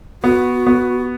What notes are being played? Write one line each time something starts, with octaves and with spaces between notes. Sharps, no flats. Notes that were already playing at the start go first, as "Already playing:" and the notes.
B3 F#4
B3